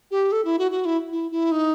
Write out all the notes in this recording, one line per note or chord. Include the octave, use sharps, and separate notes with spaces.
G4
A4
E4
F#4
F#4
E4
E4
E4
D#4